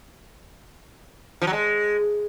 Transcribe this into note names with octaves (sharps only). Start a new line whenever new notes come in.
F3
F#3
G#3